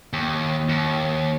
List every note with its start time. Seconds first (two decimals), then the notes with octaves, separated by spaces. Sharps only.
0.13 D#2
0.69 D#2